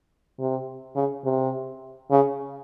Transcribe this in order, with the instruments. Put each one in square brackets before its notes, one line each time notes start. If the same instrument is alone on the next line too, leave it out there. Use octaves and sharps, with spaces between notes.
[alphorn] C3
C#3
C3
C#3